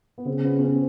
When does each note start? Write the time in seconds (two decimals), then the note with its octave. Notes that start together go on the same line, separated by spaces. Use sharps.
0.18 B3
0.26 C#3 C4
0.44 B3 C#4
0.59 C#4
0.62 C4